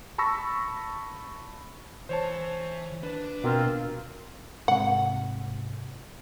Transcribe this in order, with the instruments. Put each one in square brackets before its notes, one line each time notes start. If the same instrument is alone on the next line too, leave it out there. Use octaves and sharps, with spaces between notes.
[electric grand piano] A5 B5 C#6 E6 A#6
[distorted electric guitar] E3 [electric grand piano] C5 C#5 A5
[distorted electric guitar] D4 [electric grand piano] B4
[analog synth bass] B2 [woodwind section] A#3 C4 F4
[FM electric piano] G#2 C3 [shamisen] F#5